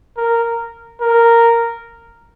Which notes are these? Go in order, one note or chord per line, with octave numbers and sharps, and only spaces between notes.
A#4
A#4